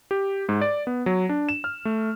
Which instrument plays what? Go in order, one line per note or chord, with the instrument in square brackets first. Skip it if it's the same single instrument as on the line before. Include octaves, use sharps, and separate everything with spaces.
[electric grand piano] G4
G#2
D5
B3
F#3
D4
E7
F6
A3